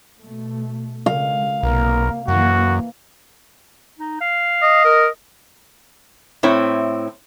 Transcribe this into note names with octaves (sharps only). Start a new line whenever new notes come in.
B2 A3
C#3 G#3 F5
B1 C3 A#3 A#4
F#2 E3 A#3 F#4
D#4
F5
D#5
A#4
A2 C4 E4 C#5